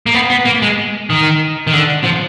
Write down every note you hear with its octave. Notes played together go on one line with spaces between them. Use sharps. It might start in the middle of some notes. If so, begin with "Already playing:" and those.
A#3
B3
B3
A#3
G#3
D#3
D#3
D3
F3